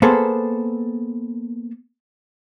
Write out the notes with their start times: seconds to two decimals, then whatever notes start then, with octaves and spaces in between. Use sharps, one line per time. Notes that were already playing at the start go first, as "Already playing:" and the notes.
0.02 A#3 B3 G#4 A4 C5